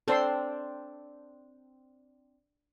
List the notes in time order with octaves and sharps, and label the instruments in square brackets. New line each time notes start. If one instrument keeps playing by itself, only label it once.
[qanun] C4 D4 G5 [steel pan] A4 C5 C6